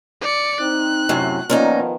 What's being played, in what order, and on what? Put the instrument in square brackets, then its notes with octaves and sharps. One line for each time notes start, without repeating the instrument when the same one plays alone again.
[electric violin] D5 C#7
[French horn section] C4 D#4 [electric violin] F#6
[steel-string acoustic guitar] F#2 A2 C3
[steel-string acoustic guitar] A#2 C#4 D#4 [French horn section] D#3 F3 B3